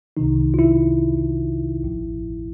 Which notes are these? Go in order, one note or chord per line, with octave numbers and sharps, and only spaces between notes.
C2 C3 D#3 D#4
F4
E4
A1 A2 F3